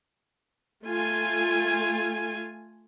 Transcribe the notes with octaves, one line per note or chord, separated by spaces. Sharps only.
A3 F4 G#5